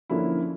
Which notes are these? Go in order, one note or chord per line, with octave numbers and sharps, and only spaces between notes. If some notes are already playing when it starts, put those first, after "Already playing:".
D3 F3 A#3 C#4 E4